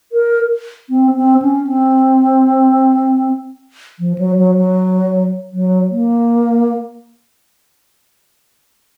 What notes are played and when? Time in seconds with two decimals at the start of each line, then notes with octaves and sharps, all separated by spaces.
0.12 A#4
0.90 C4
1.16 C4
1.42 C#4
1.67 C4
3.99 F3
4.18 F#3
4.38 F#3
4.56 F#3
5.53 F#3
5.91 A#3